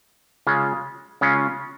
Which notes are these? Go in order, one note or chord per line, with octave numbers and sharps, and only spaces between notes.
C#3 G#3 C#4 F4
C#3 G#3 C#4 F4